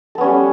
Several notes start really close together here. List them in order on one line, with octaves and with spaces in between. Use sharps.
A4 B3 C#4 G3